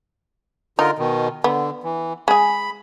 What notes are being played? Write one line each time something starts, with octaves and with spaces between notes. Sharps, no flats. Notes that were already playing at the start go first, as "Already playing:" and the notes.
D3 D#4 F4 A#4
B2 D#3
D3 B3
E3
G#3 G#4 B5